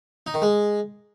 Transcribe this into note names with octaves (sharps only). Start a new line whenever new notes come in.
D#4
D#3
G#3